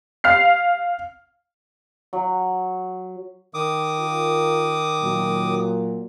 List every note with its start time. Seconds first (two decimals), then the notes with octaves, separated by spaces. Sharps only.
0.24 F5 F6 C7
2.13 F#3
3.54 D#3 D6 D#6
3.99 F4 A#4
5.02 A#2 F#3